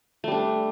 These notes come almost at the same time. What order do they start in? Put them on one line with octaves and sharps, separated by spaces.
A3 G3 D4